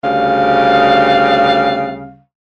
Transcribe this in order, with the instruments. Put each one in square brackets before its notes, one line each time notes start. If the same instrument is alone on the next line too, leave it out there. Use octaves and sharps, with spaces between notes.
[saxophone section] D2 C#3 G3 F5